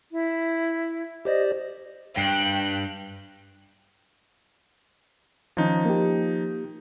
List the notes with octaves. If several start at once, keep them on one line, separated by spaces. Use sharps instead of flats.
E4
G4 C5 D5 D#5
G2 G5 F#6
D#3 F3 C#4 D#4
A#3 G4